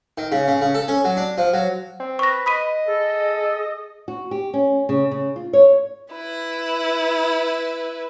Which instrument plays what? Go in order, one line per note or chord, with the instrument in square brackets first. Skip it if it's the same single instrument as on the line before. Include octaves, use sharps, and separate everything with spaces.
[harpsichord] D#3
C#3
C#3
C#3
A4
C#4
F#3
D4
F3
F#3
[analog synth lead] C4
[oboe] B4 [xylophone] C#6 A#6
[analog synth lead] D#5 [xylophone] B5 B6 D#7
[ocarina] G#4 [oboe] A4
[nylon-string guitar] F#4
G4
C#4
C#3
C#3
F4
C#5
[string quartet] E4 B4